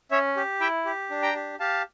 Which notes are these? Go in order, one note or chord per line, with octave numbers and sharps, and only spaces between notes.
C#4 C#5 E5
G4
E4 E5 G5
G4
D4
G5 A#5
G4
G4 F5 A5